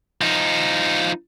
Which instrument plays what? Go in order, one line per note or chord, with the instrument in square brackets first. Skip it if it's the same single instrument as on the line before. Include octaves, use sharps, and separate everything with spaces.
[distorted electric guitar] F3 D#4